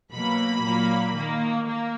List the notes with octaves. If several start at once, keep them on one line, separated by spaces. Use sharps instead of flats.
B2 F#3 A#3 B5
A#2 F#3 A#3
D#3 A#3
A#3